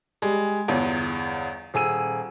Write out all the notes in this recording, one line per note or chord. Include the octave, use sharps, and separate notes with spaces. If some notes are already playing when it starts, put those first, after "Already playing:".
G3 G#3
G1 E2
D#1 G#4 E6 D#7